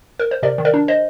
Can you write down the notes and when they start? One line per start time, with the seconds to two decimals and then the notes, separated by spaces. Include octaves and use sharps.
0.19 A#4
0.31 C5
0.43 C3 A#4 D5
0.58 D#3
0.65 A#4 D5
0.74 D4
0.88 C5 D#5